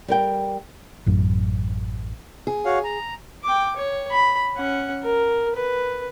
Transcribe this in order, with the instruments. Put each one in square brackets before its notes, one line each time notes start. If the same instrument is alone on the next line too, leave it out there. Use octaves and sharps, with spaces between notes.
[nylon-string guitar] G3 A#4 G5
[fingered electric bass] A1 F#2
[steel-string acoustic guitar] G#4
[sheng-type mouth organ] F#4 C#5 F5
A#5
[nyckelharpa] G5 D6
C#5
B5
C#4 F#5
A#4
B4